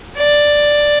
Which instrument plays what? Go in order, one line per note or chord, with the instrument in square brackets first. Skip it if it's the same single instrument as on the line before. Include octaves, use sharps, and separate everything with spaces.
[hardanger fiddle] D5